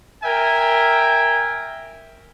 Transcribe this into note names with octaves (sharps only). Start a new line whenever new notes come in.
A#4 E5 G5 G#5